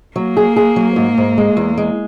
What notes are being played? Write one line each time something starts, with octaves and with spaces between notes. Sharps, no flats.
F#3 A#3
G#4
G#4
F#3
G#2
G#2
G#3
E2
G#3